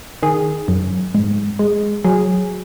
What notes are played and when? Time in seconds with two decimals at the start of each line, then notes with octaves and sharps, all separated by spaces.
0.23 D#3 G#4
0.68 F#2
1.15 G#2
1.59 G#3
2.05 F#3 G#4